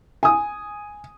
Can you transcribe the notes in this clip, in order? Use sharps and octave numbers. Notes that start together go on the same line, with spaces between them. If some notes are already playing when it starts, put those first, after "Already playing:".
G#5 D#6